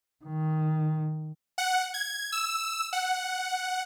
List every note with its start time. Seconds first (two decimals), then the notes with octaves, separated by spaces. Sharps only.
0.24 D#3
1.58 F#5
1.94 G#6
2.32 E6
2.93 F#5